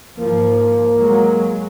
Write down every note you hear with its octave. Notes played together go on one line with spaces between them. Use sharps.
G#2 F3 A#3
F#3 G#3